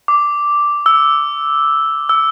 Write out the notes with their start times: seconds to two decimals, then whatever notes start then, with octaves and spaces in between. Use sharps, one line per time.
0.08 D6
0.86 E6
2.09 E6